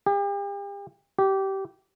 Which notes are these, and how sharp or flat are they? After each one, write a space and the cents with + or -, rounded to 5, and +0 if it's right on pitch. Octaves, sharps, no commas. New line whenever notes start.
G4 +40
G4 -20